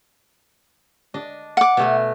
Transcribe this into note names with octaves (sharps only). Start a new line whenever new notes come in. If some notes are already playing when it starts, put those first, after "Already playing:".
D4 D#5
F#5 D6
B2 A3 G#5